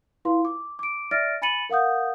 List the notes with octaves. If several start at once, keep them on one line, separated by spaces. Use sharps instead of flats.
E4 F4 B4 F5 C6
D6
D6 D7
D5 E5 F6 A6 A#6 D7
G#5 B5 A6 C#7 D#7 F#7
A#4 F5 F#5 D#6 G6